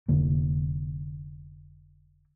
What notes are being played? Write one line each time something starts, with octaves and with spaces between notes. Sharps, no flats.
F1 D3 A#3